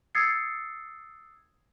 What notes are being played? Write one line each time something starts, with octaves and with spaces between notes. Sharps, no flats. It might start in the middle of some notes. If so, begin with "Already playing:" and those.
D#6 E6 G#6 A6 C7 C#7